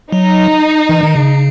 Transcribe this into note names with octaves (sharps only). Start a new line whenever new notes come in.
F#3 D#4
E3
D#3
C#3